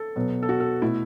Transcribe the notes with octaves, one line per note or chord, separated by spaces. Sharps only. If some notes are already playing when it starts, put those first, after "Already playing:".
Already playing: A4
B2 F#3 B3
A4
F#4
A4
B2 A3 E4